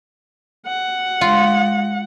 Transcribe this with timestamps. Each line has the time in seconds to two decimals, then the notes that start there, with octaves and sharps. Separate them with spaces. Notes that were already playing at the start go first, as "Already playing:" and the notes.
0.66 F#5
1.21 G#3 F4